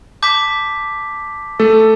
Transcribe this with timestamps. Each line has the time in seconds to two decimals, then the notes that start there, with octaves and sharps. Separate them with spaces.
0.22 A5 D6 G6 B6
1.59 A3 A4